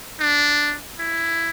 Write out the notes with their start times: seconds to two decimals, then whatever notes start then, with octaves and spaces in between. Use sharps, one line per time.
0.20 D4
0.99 E4